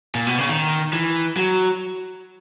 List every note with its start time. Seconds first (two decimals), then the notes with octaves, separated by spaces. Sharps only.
0.15 A#2
0.27 B2
0.38 C#3
0.49 D#3
0.93 E3
1.37 F#3